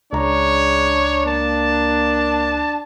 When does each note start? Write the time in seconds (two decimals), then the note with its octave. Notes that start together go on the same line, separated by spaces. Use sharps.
0.13 C#2 G#3 D4 C#5 A#5
1.26 A#3 A5